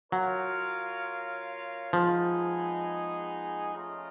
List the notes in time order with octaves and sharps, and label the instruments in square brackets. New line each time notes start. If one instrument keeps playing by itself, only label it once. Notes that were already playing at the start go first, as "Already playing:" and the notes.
[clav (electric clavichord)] F#3 [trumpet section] F4 A#4 C#5 F5
[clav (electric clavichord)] F3 [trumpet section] G#3 B3 D#4 G#4
[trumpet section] A3 C#4 F4 A#4 D#5